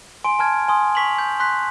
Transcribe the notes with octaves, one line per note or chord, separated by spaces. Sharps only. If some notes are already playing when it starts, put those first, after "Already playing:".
G#5 C6 D7
G#5 A5 F6 G#6
G#5 C6 D#6
C#6 B6 F7 F#7
G6
C6 F#6 B6